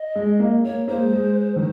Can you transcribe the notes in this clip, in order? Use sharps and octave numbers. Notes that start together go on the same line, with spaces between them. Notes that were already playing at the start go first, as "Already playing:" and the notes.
Already playing: D#5
G#3
A#3
A#3 C#5
A#3 C5
G#3
G#3
D#3